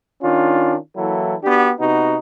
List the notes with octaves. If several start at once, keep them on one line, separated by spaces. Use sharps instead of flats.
D#3 C#4 D4 F4
E3 F#3 A#3 E4 A4
B3 D4 F#4 G4
C3 B3 D#4 F#4